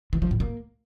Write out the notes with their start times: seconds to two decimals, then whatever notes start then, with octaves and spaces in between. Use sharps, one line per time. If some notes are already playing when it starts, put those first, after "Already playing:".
0.13 E3
0.22 F3
0.31 A2
0.40 A#3